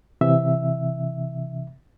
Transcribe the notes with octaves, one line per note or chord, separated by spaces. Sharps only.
C3 E3 E5